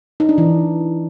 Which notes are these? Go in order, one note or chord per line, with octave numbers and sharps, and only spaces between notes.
D#4
D4
E3